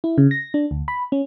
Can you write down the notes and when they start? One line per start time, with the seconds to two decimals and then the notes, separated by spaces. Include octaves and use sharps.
0.04 E4
0.18 C#3
0.31 A#6
0.54 D4
0.71 D2
0.88 B5
1.12 C#4